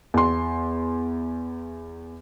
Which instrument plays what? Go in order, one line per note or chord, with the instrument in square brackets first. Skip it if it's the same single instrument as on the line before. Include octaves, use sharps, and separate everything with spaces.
[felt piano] E2 C6